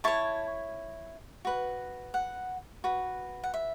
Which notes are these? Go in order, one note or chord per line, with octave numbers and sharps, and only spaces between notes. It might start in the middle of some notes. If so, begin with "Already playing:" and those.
E4 C#5 A5 C#6
F#4 B4
F#5
F#4 B4
F#5
E5